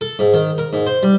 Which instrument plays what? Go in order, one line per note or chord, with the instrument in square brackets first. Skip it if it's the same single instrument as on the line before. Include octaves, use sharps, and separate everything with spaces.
[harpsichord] A4
G#2
D#3
A#4
G#2
C5
G3